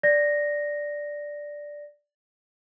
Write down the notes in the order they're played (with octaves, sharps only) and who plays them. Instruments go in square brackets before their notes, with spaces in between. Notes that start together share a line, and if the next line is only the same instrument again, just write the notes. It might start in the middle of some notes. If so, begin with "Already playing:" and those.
[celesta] D5 A#6